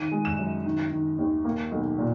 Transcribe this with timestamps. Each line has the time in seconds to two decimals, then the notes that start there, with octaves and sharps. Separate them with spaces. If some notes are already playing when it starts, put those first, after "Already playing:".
Already playing: D#3 D#7
0.12 G#3
0.25 E7
0.38 F#2
0.65 D#3
0.92 D#3
1.19 D#2
1.45 A#3
1.71 B1
1.98 A#2